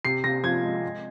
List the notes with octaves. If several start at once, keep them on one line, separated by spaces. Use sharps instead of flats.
C3 C7
C3 A#6
F3 G#6
G#3
G#3